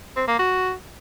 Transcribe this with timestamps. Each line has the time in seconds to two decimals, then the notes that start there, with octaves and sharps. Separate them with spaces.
0.16 C4
0.28 A#3
0.39 F#4